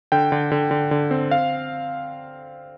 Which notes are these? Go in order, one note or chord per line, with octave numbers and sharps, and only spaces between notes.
D3 G5
D3
D3
D3
D3
C4
F5